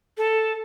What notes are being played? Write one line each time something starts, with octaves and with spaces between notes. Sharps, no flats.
A4